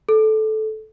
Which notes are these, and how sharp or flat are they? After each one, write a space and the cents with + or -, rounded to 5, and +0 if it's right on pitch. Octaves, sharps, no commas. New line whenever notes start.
A4 -15